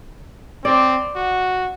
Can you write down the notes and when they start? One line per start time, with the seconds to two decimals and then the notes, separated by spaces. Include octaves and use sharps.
0.65 C4 D5
1.15 F#4